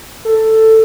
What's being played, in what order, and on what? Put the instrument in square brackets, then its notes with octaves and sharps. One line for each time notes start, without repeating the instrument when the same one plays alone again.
[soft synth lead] A4